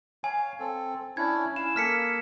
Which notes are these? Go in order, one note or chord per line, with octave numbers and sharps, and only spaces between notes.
C#5 F5 G#5
C4 A4
C#4 D4 E4 G#6
C#4 E4 F5 E7
A#3 A4 F6 B6 C#7